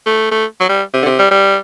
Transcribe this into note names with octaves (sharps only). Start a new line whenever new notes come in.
A3
A3
F#3
G3
C3
D3
C3
G3
G3